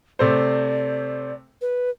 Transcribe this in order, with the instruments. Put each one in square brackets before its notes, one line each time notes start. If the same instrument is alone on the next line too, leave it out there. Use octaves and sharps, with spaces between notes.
[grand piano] C3 A3 C5 [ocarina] D5
[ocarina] B4